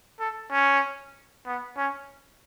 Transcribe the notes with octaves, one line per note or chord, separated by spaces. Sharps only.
A4
C#4
B3
C#4